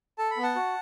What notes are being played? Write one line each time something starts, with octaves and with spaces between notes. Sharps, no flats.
A4 A5
B5
B3
F#5 A5
F#4